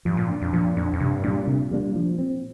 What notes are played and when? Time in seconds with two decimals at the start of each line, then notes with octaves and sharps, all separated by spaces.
0.05 G2 F3
0.17 A#2
0.30 D4
0.42 F2
0.53 A#2 F3
0.77 F2 D4
0.93 F2
1.00 G2 C3
1.24 A#2 A#3 D4
1.27 G3
1.47 C3
1.71 G3 A#3 D4
1.95 F3
2.19 C4